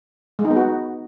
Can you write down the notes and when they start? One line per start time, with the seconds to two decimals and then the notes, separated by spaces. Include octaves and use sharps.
0.39 G#3
0.45 D#4
0.50 B3
0.56 F#4